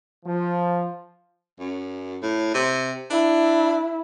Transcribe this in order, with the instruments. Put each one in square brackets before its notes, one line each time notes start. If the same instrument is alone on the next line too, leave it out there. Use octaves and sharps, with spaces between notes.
[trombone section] F3
[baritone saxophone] F#2
A2
C3
[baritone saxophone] D4 [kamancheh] E4